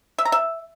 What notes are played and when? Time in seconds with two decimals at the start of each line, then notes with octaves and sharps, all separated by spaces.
0.19 E5
0.25 A#5
0.32 E5